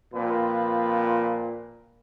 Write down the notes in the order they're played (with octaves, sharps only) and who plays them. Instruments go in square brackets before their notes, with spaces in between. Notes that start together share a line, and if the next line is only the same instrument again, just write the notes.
[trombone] A#2 [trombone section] F3 C4 B4